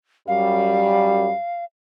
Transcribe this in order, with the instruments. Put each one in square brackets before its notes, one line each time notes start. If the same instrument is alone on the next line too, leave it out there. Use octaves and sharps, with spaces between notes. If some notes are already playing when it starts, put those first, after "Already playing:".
[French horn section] F#2 G3 [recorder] F5